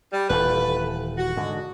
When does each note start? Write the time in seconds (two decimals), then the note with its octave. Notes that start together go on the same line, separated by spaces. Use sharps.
0.12 G3
0.30 D#1 E3 A3 B4
1.17 F#4
1.37 G#2 D3